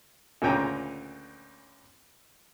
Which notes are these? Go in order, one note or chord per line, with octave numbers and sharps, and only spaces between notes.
D2 A#2 C#3 G5 G#5 A#5